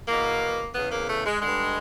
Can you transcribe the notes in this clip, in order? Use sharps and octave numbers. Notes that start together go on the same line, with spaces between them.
E2 B2 A#3
E2 C#3 E3 B3
A#3
A3
G#3
G2 D3 G#3